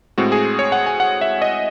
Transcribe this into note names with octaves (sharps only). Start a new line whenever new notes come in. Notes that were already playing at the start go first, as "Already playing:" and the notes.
A2 G#3 C4 F#4
G#4
C#5
F#5
G#5
F#5
E5
D#5